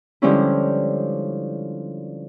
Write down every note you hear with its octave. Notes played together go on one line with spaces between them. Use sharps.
D3 F3 G3 G#3 C#4 E4